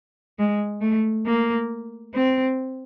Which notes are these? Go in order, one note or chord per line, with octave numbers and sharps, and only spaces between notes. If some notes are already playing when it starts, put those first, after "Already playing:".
G#3
A3
A#3
C4